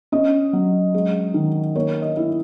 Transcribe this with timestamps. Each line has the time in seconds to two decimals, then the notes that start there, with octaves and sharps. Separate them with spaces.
0.12 C#4 D#5
0.53 F#3
0.95 G#3
1.34 D#3
1.75 A#3 C#5
2.02 D#5
2.16 E4